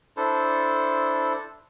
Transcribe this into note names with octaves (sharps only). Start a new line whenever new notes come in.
D4 E4 A4 C5